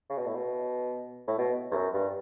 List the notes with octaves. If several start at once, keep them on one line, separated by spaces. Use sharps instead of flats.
C#3
B2
A2
B2
A2
B2
E2
F#2
G2